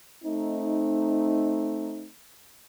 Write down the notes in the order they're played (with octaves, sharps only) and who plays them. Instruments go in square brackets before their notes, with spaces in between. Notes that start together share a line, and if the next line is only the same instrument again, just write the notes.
[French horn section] A3 C4 D#4